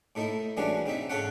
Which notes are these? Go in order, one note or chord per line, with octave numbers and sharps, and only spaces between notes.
A2 A3 D#4 E4
E3 G3 G#3 C#4 D4 F#4
C#3 C4 D#4 E5
G#2 C#3 A4 C#5 F5 F#5